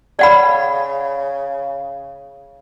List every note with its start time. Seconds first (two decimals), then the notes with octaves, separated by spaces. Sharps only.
0.19 C#3 D5 F#5 B5